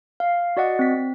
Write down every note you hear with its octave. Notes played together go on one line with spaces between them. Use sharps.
F5
F#4 D5 D#5 F#5
C4 B6
C4